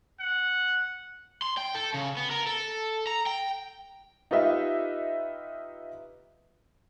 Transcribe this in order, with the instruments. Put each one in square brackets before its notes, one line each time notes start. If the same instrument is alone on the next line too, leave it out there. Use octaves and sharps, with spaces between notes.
[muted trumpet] F#5
[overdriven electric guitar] C6
G5
A4
C#3
B3
A#4
A4
A#5
G5
[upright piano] D#4 F4 G4 B4 D#5 E5